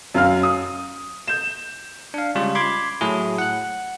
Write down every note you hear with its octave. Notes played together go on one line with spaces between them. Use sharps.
F#2 F5 F6
D#6
G6 E7
D4 F5
C#3 G3 G#3 F4
B5 C6 D6 G#6
A2 F#3 E4 G#4
F#5 F#6